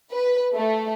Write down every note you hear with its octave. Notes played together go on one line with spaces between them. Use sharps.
B4
A3